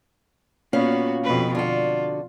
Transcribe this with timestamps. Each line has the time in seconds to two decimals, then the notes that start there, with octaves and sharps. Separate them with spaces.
0.73 A#2 B3 C#4 F#4 F5
1.24 F2 B2 B4
1.55 D3 F4 F#4